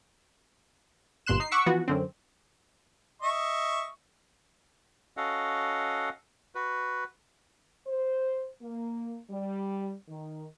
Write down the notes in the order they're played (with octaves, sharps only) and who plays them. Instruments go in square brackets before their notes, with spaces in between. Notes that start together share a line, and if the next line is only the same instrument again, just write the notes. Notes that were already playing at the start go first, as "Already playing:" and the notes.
[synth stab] G1 G2 A#2 C6 F#6 E7
D#4 C7
F#5 C#6 D6 E6 B6 C#7
E3 F3 B3 F#4
F#2 D3 C4
[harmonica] D#5 E5 C#6
[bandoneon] C#4 F#4 A4 D#5 F5 F#5
F#4 B4
[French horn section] C5
A#3
G3
D#3